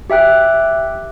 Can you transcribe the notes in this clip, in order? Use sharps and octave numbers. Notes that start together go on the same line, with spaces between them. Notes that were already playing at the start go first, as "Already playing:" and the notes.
G4 E5 G5 F#6